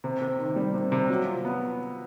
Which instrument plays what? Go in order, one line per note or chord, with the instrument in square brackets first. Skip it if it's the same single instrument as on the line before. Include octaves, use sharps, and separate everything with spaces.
[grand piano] C3
C3
D#3
G3
C3
C3
F#3
F4
B3